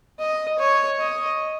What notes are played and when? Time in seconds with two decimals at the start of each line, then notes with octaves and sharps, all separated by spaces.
0.19 D#5
0.59 C#5
0.99 D#5